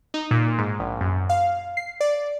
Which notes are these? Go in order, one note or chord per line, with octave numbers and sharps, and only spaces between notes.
D#4
A#2
G#2
A#1
F#2
F5
C7
D5